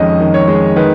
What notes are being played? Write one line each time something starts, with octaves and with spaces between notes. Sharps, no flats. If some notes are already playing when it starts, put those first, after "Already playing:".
Already playing: F2 D#3 G#3 C#4 D#5
D#3
C#5
G#3
D#3 B4